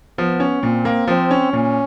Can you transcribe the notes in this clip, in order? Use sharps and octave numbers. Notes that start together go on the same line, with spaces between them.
F3 B3
C#4
A#2 C4
A#3
F3 C4
C#4
A#2 C#4